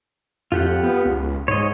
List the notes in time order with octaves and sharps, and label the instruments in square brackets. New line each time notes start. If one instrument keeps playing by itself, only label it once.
[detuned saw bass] F2 [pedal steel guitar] F4 G4 F#5
[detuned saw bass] B3
C#2
[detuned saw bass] G#2 [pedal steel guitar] C#5 D#5